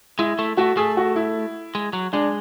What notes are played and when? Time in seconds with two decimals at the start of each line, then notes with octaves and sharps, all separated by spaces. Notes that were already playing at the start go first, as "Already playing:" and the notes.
0.19 G#3 E4
0.39 A3
0.57 A3 F#4
0.77 A3 G#4
0.97 F#4
1.16 E4
1.75 G#3
1.93 F#3
2.13 G#3 D4